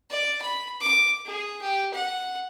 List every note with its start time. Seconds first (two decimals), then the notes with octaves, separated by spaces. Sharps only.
0.10 D5
0.42 B5
0.81 D6
1.26 G#4
1.61 G4
1.94 F#5